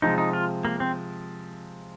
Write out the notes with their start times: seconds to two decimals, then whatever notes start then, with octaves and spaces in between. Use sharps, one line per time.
0.02 C3 F3 G#3 D#4
0.18 D#4
0.33 F4
0.65 A#3
0.80 C4